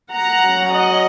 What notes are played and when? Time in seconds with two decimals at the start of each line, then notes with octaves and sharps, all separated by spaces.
0.12 F#5 A#5
0.42 F#3 C#4
0.71 D#5 F#5